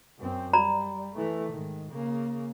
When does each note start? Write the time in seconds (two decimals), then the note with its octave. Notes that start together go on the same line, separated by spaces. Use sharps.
0.19 F#2 C4
0.53 G3 D5 A#5 B5
1.15 E3 A3
1.51 G#2 D#3
1.91 C#3 A#3